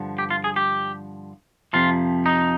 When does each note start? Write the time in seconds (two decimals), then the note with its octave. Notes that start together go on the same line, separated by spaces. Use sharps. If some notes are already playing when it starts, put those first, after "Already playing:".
Already playing: G2 D3 F3
0.18 G4
0.31 F4
0.44 G#4
0.56 G4
1.73 F2 C3 F3 F4
2.26 D#4